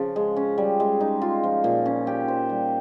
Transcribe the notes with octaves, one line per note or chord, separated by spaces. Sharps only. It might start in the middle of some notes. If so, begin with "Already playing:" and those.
Already playing: C#3 F3 C#4
G#3
C#4
G3
G#3
D#4
F4
F3
A#2
C#4
G4
C5
G3